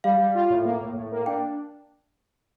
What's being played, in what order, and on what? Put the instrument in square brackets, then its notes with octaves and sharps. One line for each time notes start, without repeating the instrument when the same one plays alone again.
[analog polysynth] G3 [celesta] F5
[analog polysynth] G3
F4
A2
A#3
A2
A2
A#3
[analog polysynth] D4 [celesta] G5